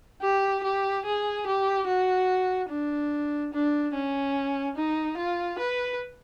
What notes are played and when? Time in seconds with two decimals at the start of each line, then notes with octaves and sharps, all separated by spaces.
0.22 G4
0.64 G4
1.05 G#4
1.46 G4
1.87 F#4
2.69 D4
3.53 D4
3.94 C#4
4.76 D#4
5.18 F4
5.59 B4